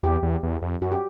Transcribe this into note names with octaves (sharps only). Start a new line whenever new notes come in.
E2 G4
E2
E2
F2
F#2 F#4
G4